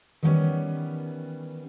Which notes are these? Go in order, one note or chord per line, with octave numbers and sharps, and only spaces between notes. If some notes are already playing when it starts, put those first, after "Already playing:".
D#3 E3 G3 A3 B3 C#4